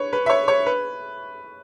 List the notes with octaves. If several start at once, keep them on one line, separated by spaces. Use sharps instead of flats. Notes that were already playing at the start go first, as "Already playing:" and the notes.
Already playing: B4 C#5
B4
E5
C#5
C#5
B4